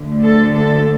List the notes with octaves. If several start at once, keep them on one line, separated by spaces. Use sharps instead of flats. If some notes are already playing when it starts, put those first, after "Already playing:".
Already playing: D2 D3 A3
A4
A4